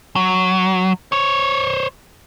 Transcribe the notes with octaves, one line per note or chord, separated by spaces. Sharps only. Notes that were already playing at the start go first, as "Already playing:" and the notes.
F#3
C5 C#5